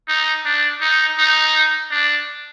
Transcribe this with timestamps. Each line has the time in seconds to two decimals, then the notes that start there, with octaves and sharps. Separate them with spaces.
0.08 D#4
0.45 D4
0.81 D#4
1.18 D#4
1.91 D4